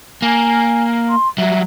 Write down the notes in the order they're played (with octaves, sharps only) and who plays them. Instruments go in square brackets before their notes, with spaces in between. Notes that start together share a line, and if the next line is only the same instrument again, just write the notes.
[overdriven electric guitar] A#3 [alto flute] G#5
[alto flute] C6
[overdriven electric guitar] F#3 G3 [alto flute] E5